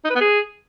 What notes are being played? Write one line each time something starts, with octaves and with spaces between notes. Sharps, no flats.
D#4
B4
B3
G#4